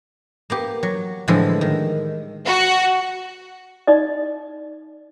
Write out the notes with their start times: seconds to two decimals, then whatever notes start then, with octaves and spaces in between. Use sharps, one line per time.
0.50 A#3 B3 G4
0.83 F#3
1.28 A2 D3 E3 F3 G3 G#3
1.61 D#3
2.46 F#4
3.87 D#4 D5 D#5